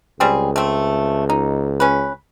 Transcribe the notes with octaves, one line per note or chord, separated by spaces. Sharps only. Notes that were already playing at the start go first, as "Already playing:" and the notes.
C#2 G3 C4 G#4
A3 C4
D#4
C#4 B4